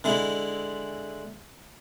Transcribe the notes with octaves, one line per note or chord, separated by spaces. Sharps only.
D3 G#3 E4